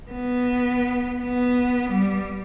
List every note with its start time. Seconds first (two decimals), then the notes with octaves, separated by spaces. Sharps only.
0.11 B3
1.24 B3
1.90 G3